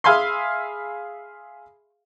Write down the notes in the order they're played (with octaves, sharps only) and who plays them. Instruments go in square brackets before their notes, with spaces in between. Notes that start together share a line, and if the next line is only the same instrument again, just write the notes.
[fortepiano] G#4 E5 F5 G#5 B5 C6